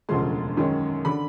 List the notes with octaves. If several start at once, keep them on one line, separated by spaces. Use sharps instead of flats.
E1 D2 C#3 F3 G#3 C6
F#2 D#3 G#3 C#4
D3 B5